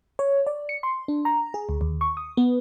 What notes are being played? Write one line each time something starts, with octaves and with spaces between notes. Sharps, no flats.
C#5
D5
C#7
C6
D4
A#5
G#4
D2
D#2
C#6
D#6
B3